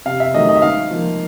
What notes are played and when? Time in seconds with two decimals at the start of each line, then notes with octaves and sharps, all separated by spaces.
0.05 C3 F5
0.20 E5
0.34 D#3 F#3 A3 D#5
0.49 D#5
0.56 E5
0.62 G#2 F5
0.91 F3 A#3